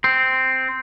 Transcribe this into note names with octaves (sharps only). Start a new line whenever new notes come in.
C4